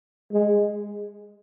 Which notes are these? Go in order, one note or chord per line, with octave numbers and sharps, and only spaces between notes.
G#3